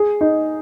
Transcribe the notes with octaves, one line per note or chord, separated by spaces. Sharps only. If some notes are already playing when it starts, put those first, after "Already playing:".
Already playing: G#4
D#4